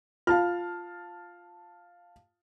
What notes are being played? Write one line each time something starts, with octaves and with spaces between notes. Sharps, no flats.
F4 F5 A5 F6